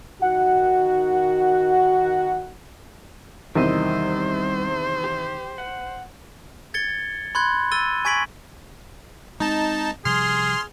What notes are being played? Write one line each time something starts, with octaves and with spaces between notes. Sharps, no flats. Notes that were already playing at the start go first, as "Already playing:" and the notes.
D#3 F#4 F#5
E2 C3 D#3 G3 C5 D#5
G4
F#5
G#6 A6 C#7 G7
B5 C6 F#6 G#6
E6 A6 D#7 G7
G#5 C#6 G#6 B6 D7 F#7
G#3 A3 C4 D#4 A5
C3 F3 G3 G#4 C6 F6